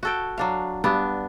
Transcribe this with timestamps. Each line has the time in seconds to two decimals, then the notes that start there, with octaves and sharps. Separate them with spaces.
0.03 F#4 A4 G5
0.38 F#3 D4 F5
0.84 G2 B3 D4